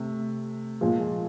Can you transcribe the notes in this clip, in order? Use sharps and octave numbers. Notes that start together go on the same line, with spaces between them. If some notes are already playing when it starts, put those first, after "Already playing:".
Already playing: C3 A3
A#2 F3 G#3